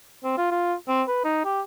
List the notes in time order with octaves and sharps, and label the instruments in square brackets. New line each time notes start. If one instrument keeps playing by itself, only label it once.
[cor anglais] C4
F4
F4
C4
B4
D#4
G4